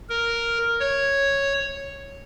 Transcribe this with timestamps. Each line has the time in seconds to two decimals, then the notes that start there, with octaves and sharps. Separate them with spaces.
0.09 A#4
0.80 C#5